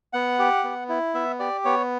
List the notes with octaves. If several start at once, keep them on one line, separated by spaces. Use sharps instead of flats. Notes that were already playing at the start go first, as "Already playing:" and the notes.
B3 F#5
G4
B3
E4
B3 E5
G4 D5
B3 C#5